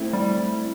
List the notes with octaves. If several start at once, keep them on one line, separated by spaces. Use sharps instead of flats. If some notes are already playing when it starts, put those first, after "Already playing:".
Already playing: A3 C4 E4
G3